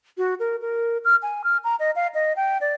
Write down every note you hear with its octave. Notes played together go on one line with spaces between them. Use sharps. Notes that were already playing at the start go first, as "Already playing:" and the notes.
F#4
A#4
A#4
F6
G#5
F6
A#5
D#5
F5
D#5
G5
D5